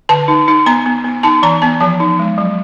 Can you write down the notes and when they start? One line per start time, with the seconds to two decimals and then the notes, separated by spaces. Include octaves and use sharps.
0.09 D3 A5
0.28 D#4
0.48 D#4
0.66 B3 A#5
0.86 B3
1.04 B3
1.23 D#4 A5
1.43 E3 A#5
1.62 B3 A5
1.80 F3 A5
2.00 D#4
2.19 G#3
2.38 F#3